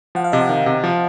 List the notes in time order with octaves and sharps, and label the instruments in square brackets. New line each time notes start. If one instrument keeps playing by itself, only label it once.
[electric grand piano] F3 [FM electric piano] F#5
[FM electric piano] F5
[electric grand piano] C3 [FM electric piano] D#5
[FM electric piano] F#5
[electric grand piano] D#3
C3
F3